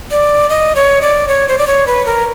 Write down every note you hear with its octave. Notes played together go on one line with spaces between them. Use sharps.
D5
D#5
C#5
D5
C#5
C5
D5
C#5
B4
A#4